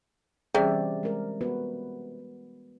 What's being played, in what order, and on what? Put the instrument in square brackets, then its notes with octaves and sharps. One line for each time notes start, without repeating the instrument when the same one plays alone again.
[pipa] C3 [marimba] E3 G3 C#4 [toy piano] G#4 [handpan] D5
[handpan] G#3 A#4
B3 F#4 B4